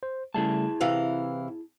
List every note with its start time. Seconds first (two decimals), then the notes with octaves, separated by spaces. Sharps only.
0.03 C5
0.34 C#3 G3 A3 E4 G#4 A5
0.81 C3 E3 B4 F5